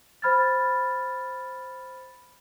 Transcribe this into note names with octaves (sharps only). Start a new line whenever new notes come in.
C5 B5 F6 G#6 A6